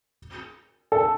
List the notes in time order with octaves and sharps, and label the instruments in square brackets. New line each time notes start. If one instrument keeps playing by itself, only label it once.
[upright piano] A4